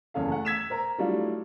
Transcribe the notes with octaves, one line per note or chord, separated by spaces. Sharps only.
F#1 E2 C#3 C#4 A4 F5
A3 F#5
E6 G#6 B6 E7
A#4 C5 A#5
F#3 G3 A3 D4 E4 F4